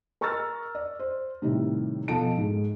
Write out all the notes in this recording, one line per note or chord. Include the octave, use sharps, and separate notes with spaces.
A#4 A#5 C#6 E6 F6 A6
D5
C5
A2 C3 D#3 G3
B2 F3 A4 A5 D7
G#2 G#3